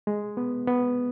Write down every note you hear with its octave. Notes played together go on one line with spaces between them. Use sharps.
G#3
B3
B3